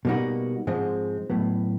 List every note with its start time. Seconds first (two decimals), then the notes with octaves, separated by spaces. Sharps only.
0.05 B2 G3 A#3 D#4 F#4
0.67 G#2 F3 G#3 C4
1.30 A2 F#3 B3